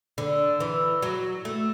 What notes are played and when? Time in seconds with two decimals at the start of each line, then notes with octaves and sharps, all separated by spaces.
0.18 D3
0.60 E3
1.02 F#3
1.45 A3